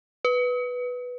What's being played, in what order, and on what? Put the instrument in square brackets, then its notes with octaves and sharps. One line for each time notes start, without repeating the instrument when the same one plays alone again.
[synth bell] B4